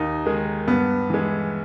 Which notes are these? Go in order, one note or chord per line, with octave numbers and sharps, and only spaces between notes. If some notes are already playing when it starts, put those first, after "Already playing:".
Already playing: D#2 D#4
D#3 G#3
G2 B3
E3 G#3